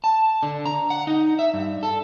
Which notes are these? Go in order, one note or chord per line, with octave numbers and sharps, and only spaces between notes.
A5
D3
A#5
F#5
D#4
E5
G2
A4